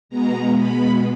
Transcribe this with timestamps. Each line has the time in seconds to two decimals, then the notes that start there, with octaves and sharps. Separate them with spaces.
0.09 B2 G#3 B3 A#5
0.57 B5